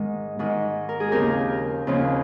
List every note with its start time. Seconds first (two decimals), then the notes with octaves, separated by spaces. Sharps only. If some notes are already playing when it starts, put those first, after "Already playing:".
Already playing: G#2 D#3 G#3
0.39 G#2 D#3 G#3
0.89 A#4
1.00 G#4
1.11 D#2 C#3 F3 C4 G4 A#4
1.87 D#2 C#3 F3 C4